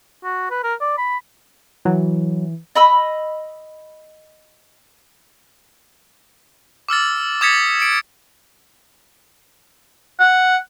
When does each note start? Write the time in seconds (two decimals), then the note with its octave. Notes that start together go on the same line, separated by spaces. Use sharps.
0.24 F#4
0.50 B4
0.63 A#4
0.81 D5
0.98 B5
1.85 E3 F#3
2.75 D#5 B5 E6
6.89 D6 E6 F6 A6
7.41 D6 D#6 G#6 A6 B6 C#7
7.80 C#7 D7
10.20 F#5